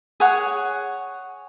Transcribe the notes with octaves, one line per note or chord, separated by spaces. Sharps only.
G#4 C#5 F#5